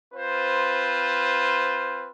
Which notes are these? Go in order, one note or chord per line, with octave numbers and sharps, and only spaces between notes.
C4 F4 B4 C5